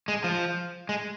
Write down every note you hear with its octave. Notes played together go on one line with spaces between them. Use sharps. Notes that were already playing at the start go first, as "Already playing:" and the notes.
G#3
F3
G#3